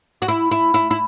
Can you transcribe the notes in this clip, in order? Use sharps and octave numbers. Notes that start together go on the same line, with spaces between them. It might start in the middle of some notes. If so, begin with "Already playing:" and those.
F#4
E4
E4
E4
E4